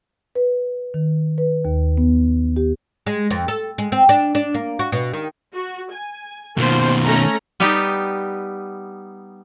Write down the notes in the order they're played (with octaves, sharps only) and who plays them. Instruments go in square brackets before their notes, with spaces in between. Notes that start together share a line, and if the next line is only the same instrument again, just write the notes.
[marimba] B4
D#3
B4
D#2
B3
G4
[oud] G#3
F2
A4
G#3
C4
D4
D4
A#3
F#4
B2
D#3
[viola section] F#4
G#5
[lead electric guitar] B2 D#3 [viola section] A#3 F4 C5
[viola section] A3 C#4 A#5
[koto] G3 B3 D#4 G4